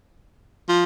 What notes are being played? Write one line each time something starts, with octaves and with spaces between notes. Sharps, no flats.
F3